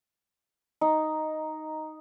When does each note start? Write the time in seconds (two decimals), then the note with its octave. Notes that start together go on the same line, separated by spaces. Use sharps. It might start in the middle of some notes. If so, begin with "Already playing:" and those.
0.81 D#4